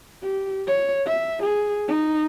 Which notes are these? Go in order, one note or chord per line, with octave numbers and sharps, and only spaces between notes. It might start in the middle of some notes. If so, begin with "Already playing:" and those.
G4
C#5
E5
G#4
D#4